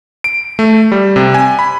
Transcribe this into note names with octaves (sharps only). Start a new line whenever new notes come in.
D7
A3
G3
C3
G#5
B5